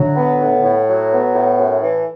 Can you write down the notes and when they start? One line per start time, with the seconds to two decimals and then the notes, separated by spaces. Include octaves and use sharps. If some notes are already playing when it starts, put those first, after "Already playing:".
Already playing: A2 D3 F#3
0.16 B3
0.40 A2
0.63 A2
0.87 F#3
1.11 B3
1.34 A2
1.59 F#2
1.82 E3